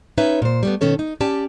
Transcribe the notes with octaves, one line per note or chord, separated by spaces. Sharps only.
C#4 D#4 B4 C#5 E5
A#2 C5
G3 A3 B3
B2 D#3 C#4 A4 C#5
D#4
C#4 G4 D5 G5 A5